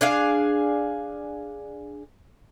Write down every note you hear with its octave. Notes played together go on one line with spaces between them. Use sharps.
D4 G#4 F5